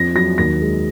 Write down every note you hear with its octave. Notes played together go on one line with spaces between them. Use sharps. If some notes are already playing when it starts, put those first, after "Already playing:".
Already playing: F2 A#6
F#3 A#6
D#2 A#6
G#3